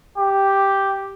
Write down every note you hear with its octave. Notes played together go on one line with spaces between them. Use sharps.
G4